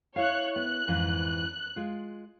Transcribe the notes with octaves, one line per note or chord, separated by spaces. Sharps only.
E4 C#5 F5 F#6
B3 F#6
F2 G#2 E3
G#3 F4